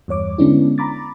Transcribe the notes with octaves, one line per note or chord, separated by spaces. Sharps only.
E2 G2 C#5 D6
D3 G#3 B3 C#4 D4 E4
A#5 B5 D6 A6